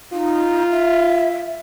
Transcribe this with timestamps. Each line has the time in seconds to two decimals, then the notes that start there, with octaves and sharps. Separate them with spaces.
0.13 D#4 F4
0.71 E5